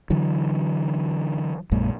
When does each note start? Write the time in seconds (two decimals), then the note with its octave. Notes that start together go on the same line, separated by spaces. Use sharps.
0.10 D3 E3 F#3
1.71 A#1 F#2 A#2 G#3